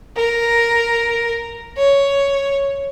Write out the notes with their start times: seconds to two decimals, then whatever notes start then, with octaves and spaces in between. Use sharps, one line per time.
0.16 A#4
1.77 C#5